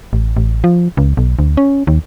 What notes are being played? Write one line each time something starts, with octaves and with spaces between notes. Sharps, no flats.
A1
A1
F3
C#2
B1
D2
C#4
D#2